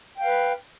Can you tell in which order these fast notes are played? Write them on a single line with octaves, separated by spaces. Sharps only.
G5 F5 B4